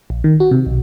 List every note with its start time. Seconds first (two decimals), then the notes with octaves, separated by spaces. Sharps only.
0.10 A#1
0.24 D#3
0.40 F#4
0.51 C3
0.66 B1